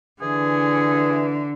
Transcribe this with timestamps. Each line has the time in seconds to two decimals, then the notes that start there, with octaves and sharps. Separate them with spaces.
0.22 D3 E3 G#4